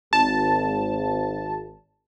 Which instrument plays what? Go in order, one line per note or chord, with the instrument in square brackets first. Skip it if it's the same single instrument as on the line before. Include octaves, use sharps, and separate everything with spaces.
[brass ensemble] G#1 [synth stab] A5